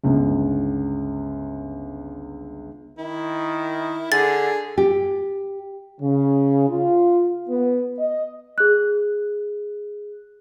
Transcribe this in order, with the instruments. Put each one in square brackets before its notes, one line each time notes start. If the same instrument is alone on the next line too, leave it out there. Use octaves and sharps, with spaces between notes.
[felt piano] G1 C#2
[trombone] D#3 [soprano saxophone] E4
[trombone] D3 [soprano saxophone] G#4 [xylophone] A6
[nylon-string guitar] G4
[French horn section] C#3
F4
B3
D#5
[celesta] G#4 F#6